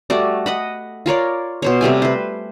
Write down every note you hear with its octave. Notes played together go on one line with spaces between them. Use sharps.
G3 A3 F#4 D5
D#5 F#5 B5
F4 A#4 C#5 D5
B2 C5 C#5
C3 G3 A3 G#5
B4 C5